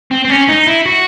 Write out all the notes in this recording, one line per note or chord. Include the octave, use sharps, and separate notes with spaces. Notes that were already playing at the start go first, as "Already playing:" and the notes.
C4
C4
C#4
D#4
E4
F#4